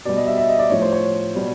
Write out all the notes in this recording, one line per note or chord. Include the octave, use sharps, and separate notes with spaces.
B2 G3 D5
D#5
E5
E5
D#5
D5
A2 F3 C#5
C5
C#5
B2 G3